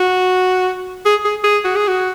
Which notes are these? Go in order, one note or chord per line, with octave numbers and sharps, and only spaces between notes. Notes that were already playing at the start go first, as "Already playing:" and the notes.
Already playing: F#4
G#4
G#4
G#4
F#4
G#4
F#4